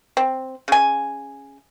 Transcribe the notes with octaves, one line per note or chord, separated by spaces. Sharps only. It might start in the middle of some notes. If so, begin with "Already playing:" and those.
C4
C#3 G#5